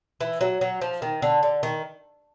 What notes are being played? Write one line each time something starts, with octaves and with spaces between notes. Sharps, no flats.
E3
F#3
F#3
F3
D#3
D3
D3
D#3